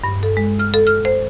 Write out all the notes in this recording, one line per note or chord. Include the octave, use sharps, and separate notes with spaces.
G2
A4
G#3
F6
A4
F6
C5